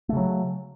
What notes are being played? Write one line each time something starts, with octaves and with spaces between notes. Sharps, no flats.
C#3 F#3 A3